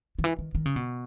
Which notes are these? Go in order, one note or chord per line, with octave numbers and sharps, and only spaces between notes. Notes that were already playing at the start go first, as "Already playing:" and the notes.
D#3
E3
D#3
D#3
C#3
B2